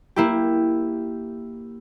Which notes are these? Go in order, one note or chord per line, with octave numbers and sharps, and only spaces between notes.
A#3 E4 G4